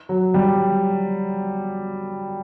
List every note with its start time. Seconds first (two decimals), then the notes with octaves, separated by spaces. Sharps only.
0.09 F#3
0.34 G3